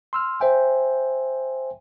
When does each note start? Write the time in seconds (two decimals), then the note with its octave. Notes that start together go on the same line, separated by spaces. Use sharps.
0.13 C6 E6 F6
0.40 C5 E5 G5 G#5